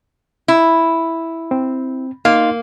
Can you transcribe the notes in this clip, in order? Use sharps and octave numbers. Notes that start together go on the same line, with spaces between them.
E4
C4
A#3 D#4 F5 C6